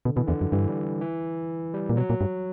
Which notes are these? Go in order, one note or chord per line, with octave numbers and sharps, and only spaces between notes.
B2 D3
B2 E3
E2 D3
F#2
G2 E3
G3
E3
G3
A#2
B2 F#3
A#2
G2